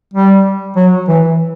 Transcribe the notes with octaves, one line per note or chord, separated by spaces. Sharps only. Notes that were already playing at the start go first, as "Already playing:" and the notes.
G3
F#3
E3